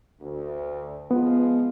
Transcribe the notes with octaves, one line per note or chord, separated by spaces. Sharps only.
D2
F3 G#3 B3 F4